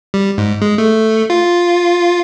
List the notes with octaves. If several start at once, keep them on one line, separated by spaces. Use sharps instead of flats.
G3
G#2
G#3
A3
F4